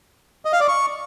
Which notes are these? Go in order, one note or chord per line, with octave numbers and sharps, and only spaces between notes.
D#5
F5
D5
C#6